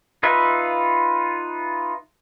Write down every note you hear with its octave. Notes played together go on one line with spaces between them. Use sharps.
D#4 F4 B4 E5